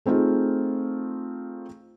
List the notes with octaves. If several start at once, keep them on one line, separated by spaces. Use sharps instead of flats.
A3 C4 D#4 F4 G#4